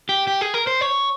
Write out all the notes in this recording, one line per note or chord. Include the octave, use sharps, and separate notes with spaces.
G4
G4
G#4
A#4
C5
C#5